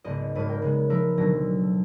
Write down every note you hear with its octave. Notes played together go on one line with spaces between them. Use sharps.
G#1 C#2 B3 D5 D#5
D#1 G#1 B4 D#7
A#4 G5
C#3 G#3 B3
F3 D#4 A#4 B4 E5
D2 B2 D3 F#3 A#6